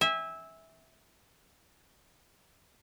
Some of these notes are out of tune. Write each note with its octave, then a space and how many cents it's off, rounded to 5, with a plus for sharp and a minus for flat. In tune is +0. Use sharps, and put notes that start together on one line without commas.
E5 -15 G#5 -30